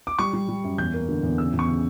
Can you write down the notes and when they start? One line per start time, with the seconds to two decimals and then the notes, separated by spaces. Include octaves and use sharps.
0.07 D6
0.19 G3 C#6
0.33 G3
0.48 G3
0.64 F#2
0.78 E2 G6
0.94 A#3
1.08 D3
1.23 E2
1.38 C#3 E6
1.53 E2
1.59 C#6
1.68 C#3